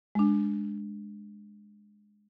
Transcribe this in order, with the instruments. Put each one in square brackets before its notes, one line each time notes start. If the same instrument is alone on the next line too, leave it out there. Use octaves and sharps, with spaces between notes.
[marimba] G#3 D4